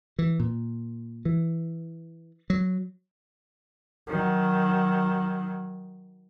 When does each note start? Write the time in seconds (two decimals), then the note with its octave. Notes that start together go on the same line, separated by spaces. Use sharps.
0.19 E3
0.40 A#2
1.25 E3
2.50 F#3
4.07 D#3 F#3